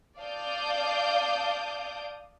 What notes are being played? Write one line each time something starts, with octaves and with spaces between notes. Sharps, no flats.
D5 F5 A5 D6 D#6 G6